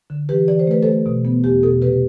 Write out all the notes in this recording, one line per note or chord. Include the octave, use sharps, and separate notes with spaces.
D3
E3 G4 B4
E3 D5
C5
A3 B4
A3 A4 C5
B2
B3
E2 G4
B2 A4
C3 G4 B4